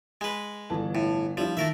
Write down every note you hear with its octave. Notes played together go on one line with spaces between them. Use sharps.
G#3 B4
G1 E3 A5
A2
F3 G3 D4 E4
D#3 A3 A#4 E5